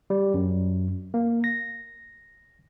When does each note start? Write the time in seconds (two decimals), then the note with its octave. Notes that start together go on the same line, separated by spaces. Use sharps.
0.10 G3
0.34 F#2
1.14 A#3
1.44 A#6